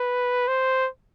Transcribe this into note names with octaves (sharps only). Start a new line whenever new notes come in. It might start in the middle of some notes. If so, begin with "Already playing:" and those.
Already playing: B4
C5